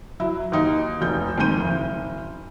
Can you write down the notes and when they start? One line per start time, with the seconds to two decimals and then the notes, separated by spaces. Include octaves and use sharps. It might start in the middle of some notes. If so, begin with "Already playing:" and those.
0.20 F#3 E4
0.52 D#2 D#4
1.01 F1 G6
1.38 F2 G#2 D#3 G6 D#7
1.58 F#1